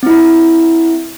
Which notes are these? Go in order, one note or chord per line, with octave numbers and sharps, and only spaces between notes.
C4 E4